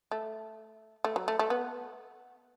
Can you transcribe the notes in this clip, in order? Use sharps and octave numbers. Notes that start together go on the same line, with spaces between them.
A3
A3
F#3
A3
A3
B3